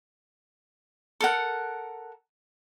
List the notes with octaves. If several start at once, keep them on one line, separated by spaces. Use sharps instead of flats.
A4 A#4 F#5